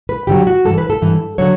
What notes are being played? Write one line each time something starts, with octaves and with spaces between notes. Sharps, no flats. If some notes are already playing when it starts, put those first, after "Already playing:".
B4
G2 D3 F#3 G4
F#4
G2 E3 A4
B4
A4
G2 E3
D3 F#3 C#5